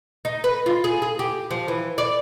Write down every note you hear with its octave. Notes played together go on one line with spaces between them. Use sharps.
D#4
B4
F4
G#4
G#4
G4
F3
E3
D5